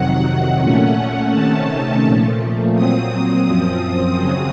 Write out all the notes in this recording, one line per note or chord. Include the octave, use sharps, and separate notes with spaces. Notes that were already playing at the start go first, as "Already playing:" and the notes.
Already playing: F2 C3 D#3 F#3 F#5
A#2 A3 C#4
C3 D#3 A3 C#4 A5
A#2 F3 A3
A#2 F#3 C4 D#6
F#2 F3 C4 D#6
D#2 C#3 F#3 C4